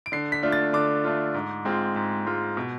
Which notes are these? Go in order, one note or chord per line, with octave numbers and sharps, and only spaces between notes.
D7
D3 C7
B6
A3 D4 F4
A6
D3 D6
A3 D4 F4
G#2
G#3 C4 F4
G#2
G#3 C4 F4
B2